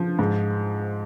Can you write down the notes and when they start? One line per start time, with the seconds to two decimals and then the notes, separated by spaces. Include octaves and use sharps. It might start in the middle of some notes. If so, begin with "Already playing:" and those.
Already playing: F3
0.19 G#2